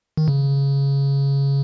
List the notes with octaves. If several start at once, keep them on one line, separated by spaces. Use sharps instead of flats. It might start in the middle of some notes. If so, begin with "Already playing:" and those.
D#3
C#3